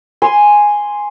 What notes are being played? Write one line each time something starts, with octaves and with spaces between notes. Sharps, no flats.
G#5 C6